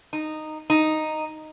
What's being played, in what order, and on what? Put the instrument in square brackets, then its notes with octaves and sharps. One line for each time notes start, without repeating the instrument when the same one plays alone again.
[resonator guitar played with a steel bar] D#4
D#4